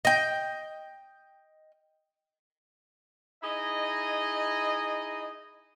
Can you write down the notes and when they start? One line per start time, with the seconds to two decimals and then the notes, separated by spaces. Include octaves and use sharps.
0.05 D#5 G5
3.43 D#4 E4 G#4 D#5